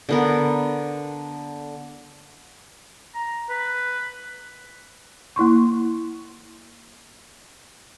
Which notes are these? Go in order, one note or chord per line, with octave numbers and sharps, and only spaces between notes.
D3 B3 A#4
A#5
B4
A#3 E4 C6 C#6